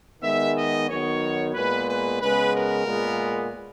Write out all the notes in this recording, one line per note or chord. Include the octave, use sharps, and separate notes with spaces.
D#3 G#3 B3 E5
D#5
D#3 F#3 B3 C#5
A#2 G#3 B3 B4
B4
C#3 G#3 B3 B4
A#4
A#2 G#3 B3